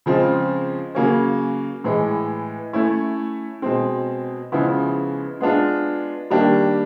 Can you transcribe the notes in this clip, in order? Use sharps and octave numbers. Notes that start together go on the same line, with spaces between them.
C#3 F3 G#3 C4 F4
C#3 F#3 A#3 C#4
A2 E3 G#3
A3 C#4 E4
B2 G#3 C4
C#3 F3 G#3 B3 E4
G#3 B3 D4 F4
D#3 G3 A#3 D4 G4